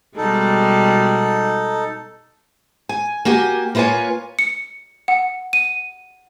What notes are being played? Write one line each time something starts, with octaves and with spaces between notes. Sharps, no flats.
B2 G3 G#3 D#4 A4
G#5
A#3 F#4 G4 G#5
A#3 E4 F4 B4 C#5 G#5
C#7
F#5
D#7